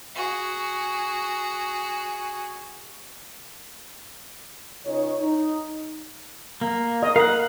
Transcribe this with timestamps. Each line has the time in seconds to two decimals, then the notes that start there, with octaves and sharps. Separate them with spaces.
0.15 F#4 G#4
4.86 C#2 D#4 C#5
5.19 D#4
6.61 A#3
7.03 D#5
7.16 A#4 F5 F#5